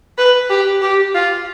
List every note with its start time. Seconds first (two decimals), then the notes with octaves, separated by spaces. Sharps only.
0.18 B4
0.50 G4
0.82 G4
1.15 F4